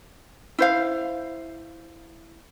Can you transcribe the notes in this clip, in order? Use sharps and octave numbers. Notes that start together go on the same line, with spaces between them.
E4 C5 F5